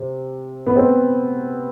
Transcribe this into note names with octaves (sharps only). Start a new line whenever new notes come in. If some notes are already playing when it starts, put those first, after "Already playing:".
Already playing: C3
B3
C4